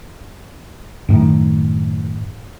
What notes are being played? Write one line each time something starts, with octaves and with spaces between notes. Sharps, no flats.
F#2 A2 D#3